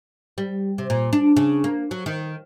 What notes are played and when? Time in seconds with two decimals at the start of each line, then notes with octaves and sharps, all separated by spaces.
0.38 G3
0.78 C3
0.90 A#2
1.13 D4
1.37 C#3
1.64 A#3
1.91 F#3
2.06 D#3